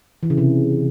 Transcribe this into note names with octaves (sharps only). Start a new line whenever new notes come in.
E3
C#3
C3